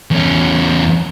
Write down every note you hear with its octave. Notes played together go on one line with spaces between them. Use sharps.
E2 C#4